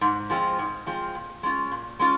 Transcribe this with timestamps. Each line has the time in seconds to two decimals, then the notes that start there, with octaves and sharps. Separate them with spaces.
0.01 G#2
0.30 F3 G#3 C4 F4
0.59 G#2
0.87 F3 G#3 C4 F4
1.15 A#2
1.43 G#3 C#4 F4
1.71 A#2
1.99 G#3 C#4 F4